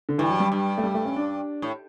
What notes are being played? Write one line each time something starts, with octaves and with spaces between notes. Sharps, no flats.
D3
G2 E3
F#3
G3
G2
A3
G3
A3
C#4
D4
A2